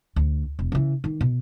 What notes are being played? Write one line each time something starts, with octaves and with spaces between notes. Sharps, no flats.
D2
E1
C#3 E3
D#3 E3
B2